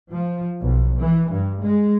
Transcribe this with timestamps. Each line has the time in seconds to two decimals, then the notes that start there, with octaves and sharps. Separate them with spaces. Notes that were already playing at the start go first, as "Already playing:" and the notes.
0.12 F3
0.62 B1
1.00 E3
1.31 G2
1.62 G#3